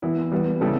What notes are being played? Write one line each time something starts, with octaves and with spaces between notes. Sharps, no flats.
E3 B3 E4
E3 G3 B3
C#3 G3 B3 E4 A4